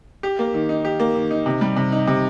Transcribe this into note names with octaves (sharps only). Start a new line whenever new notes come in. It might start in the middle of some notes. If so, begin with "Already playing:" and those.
G4
A#3
D#3
D#4
G4
A#3
D#3
D#4
C3
G3
C3
D#4
C3